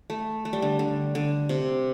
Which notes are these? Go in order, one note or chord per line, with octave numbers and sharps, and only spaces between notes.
A3
A3
G3
D3
D3
D3
C3